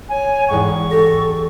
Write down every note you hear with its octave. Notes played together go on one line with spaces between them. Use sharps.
C#5 G#5
E2 G#2 G5 C#6
G4 A4 A#6